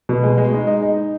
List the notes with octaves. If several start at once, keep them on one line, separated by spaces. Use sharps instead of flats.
B2
G#3
G#3
D#4
D#4
D#4